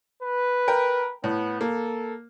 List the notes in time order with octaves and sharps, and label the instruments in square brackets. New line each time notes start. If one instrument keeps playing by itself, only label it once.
[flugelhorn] B4
[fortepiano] A#4 G5
[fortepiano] A2 [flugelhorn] B3
[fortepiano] A#3 [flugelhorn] A4